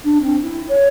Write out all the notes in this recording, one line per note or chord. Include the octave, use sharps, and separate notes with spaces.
D4
C4
E4
C#5